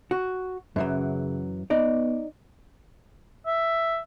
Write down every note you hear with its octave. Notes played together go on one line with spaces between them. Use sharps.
F#4
F#2 C#3 E3 F#3
B3 D#4 D5
E5